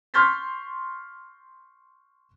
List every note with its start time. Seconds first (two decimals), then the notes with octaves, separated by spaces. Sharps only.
0.14 C6 C#6 F6 G6 A6 B6